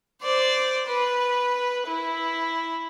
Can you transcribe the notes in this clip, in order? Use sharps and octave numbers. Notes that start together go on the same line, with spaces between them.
C5 D5
B4
E4